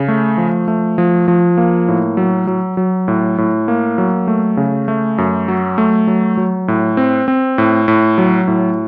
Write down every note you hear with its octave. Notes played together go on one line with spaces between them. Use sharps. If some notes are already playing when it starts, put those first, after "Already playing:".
Already playing: C#3
A3
F3
A3
F3
F3
A#3
A2
F#3
F#3
F#3
A2
A2
A#3
F#3
A3
C#3
A3
F#2
F#3
A3
F#3
F#3
A2
C4
C4
A2
A2
F#3
A2